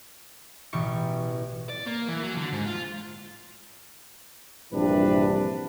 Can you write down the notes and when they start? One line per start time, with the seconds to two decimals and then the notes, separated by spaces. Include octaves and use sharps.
0.73 A1 B2 E3 G4 C#6 C#7
1.69 D5
1.86 A#3
2.08 E3
2.23 F#3
2.37 D3
2.53 G#2
2.66 F4
4.72 A#1 G2 C3 E3 D4 B4